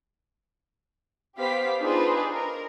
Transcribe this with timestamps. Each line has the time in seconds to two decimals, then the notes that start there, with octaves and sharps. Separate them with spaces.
1.37 B3 G4 C5 F5 B6
1.80 D4 D#4 F4 G#4 B4 C5
2.33 A#4